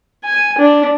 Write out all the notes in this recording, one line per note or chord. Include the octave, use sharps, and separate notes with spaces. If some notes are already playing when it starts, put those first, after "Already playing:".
G#5
D4